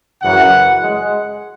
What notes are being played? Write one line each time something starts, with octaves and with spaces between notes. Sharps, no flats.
F#2 C#3 E3 F#5
G#3